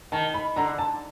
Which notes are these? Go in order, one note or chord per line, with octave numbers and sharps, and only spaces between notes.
D#3 A5
B5
D3 A#5
A5